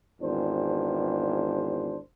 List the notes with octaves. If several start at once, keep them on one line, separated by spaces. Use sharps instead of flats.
G#1 E2 D4 C5